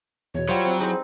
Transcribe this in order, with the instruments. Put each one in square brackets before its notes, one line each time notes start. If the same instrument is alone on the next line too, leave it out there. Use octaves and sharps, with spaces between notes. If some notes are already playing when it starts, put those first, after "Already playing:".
[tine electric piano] E2 B2 [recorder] C#5
[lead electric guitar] F#3 [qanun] G3 G5 C6 [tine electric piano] F4 C5
[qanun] C4
[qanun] C4 D#4 B4 [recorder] E4 [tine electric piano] G#4 C5